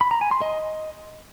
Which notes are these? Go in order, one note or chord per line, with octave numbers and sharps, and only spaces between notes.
B5
A#5
G#5
C6
D#5